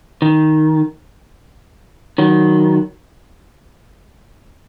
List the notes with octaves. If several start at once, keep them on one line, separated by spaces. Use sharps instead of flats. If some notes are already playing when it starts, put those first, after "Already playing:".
D#3
D#3 F#3